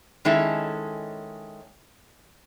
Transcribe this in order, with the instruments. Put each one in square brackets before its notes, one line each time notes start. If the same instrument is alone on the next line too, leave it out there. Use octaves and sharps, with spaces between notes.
[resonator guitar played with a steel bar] D#3 G#3 C#4 E4 A4